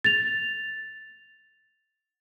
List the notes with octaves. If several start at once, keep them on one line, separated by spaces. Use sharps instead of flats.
A6 F7